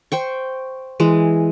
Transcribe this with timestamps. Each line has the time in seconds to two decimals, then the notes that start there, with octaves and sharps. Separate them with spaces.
0.12 C5 G5 C#6
1.00 E3 G#3